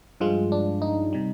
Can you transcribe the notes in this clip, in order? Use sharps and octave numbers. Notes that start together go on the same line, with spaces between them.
G2 F3 G#3 F4
D4
D#4
C3 G3